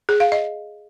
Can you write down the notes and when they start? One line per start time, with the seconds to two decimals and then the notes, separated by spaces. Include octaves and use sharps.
0.09 G#4
0.20 F5
0.32 D#5